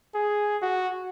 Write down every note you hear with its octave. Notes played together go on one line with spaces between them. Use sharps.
G#4
F#4